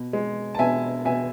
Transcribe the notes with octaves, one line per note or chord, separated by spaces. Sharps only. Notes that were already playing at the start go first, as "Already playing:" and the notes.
Already playing: B2
G#3
A5
B2 E5 G#5
B2 E5 G#5